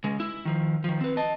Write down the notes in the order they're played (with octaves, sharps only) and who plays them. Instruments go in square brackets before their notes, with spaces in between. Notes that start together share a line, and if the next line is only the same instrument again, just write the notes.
[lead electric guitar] C#3 G#3
E4
D#3 F3
D#3 F3
C4 B4
D#5 A5